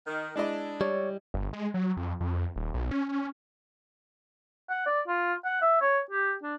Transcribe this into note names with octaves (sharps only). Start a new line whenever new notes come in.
D#3
G#3 D4 E4 D#5
G3 C#5 D5
G1
G#3
F#3
F2
F2
D#1
B1
C#4
F#5
D5
F4
F#5
E5
C#5
G4
D4